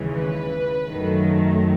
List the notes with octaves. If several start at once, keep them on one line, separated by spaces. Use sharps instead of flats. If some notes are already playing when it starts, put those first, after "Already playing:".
Already playing: D#2 C#3 E3 G#3
B4
F#2 D#3 F#3 A3